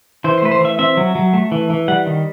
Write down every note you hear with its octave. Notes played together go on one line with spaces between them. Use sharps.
E3 C5
C5
A3 B4
C5
E3 E5
C4 E5
F#3
F#3
A3
E3
E3
G3 F#5
D#3